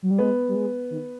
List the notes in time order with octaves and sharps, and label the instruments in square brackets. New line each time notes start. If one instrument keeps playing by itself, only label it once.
[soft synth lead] F#3
G3
[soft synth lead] G#3 [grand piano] B3
[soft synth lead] G3
G#3
D#3